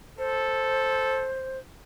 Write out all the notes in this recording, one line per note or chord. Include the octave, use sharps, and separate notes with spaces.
A4 C5